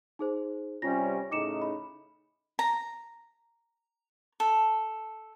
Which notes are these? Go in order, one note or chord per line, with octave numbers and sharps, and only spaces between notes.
D#4 G#4 C5
C3 G3 C#4 F4 A#6
A2 C#3 D#4 D6 C#7 E7
B5
A#5
A4